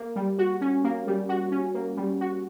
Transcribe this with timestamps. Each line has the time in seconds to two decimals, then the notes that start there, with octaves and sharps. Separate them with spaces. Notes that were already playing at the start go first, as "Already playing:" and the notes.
Already playing: A#3
0.16 G3
0.38 F#4
0.61 C#4
0.84 A#3
1.07 G3
1.29 F#4
1.52 C#4
1.75 A#3
1.97 G3
2.21 F#4